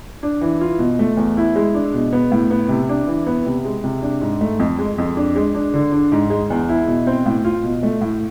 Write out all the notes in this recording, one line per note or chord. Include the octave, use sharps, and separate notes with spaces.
D4
E3
F4
B2
A3
E2
E4
G#3
D4
B2
B3
A2
B3
C3
D4
E3
B3
C3
G#3
C3
D4
G#2
A3
F2
G#3
F2
D4
G#3
D4
D3
D4
G#2
G#3
E2
E4
B2
C4
A2
F4
B2
A3
A2